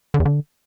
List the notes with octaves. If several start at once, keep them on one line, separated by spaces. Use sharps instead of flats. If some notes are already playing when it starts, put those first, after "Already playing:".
D3
E2
D3